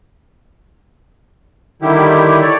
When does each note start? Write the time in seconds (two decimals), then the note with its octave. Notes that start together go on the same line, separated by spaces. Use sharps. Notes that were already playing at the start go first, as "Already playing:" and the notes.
1.82 D3 D#3 G3 E4 G4
2.41 A4 C#5 D5